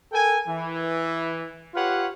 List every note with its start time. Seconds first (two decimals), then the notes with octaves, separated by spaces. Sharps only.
0.12 A4 A#4 G5 G#5
0.48 E3
1.74 F4 G4 B4 C#5 F5 F#5